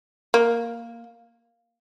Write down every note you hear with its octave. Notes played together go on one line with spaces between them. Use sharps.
A#3